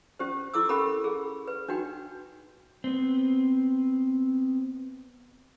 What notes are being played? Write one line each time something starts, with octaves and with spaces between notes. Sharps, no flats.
C#4 G4 C5
E4 A4 D6 E6
C#4 G4 A4 A#4 B5
G#4
B4
D4 D#4 F#4 G5
B3 C4